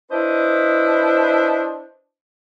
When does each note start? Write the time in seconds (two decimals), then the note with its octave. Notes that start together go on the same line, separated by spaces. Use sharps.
0.11 D4 E4 B4 C5 D#5